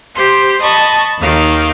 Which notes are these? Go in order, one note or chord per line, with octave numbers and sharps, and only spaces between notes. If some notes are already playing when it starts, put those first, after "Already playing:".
G4 C5 C6
D#5 A5 B5 C#6
D#2 D#3 F5 D6